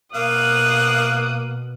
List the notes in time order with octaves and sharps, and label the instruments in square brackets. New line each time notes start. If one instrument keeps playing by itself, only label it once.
[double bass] B2 [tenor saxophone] A#3 [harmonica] F5 [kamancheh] D#6 F#6